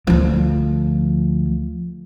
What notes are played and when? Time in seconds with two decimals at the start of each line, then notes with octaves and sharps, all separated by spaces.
0.07 D2 F3